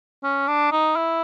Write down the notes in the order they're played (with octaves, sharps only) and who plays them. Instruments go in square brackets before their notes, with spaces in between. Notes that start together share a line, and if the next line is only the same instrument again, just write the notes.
[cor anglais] C#4
D4
D#4
E4